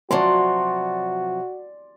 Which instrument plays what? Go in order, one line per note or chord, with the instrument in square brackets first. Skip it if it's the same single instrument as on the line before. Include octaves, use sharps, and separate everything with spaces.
[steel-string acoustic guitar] C3 F3 F#3 [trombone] F#4 [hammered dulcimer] D5 C6